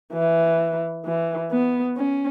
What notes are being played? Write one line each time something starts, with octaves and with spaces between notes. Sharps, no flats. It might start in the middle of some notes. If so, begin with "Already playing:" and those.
E3
E3
B3
C#4